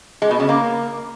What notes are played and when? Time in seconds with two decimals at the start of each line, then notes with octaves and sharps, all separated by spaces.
0.22 G#3
0.31 B2
0.40 C#3
0.49 A#3